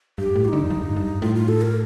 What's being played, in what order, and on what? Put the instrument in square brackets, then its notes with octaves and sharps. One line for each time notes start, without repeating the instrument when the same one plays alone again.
[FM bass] G2 [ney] G4
[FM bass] A2
[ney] F4
[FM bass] D3 [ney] D#4
[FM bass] F2
G2
G2
[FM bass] A2 [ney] F4
[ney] F4
A4
A#4